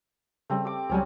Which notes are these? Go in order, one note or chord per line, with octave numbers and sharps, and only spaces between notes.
C#3 G3 A3 C4
G4 D6
C#2 F#3 G3 C4 C#4 G#5